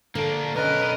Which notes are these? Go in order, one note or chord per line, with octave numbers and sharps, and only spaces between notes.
D3 A#3 D4
B1 C#4 A#4 B4 D#5